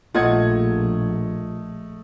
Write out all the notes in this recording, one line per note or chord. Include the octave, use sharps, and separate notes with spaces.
A#1 A3 F4 C5 D#5 F#5 G#6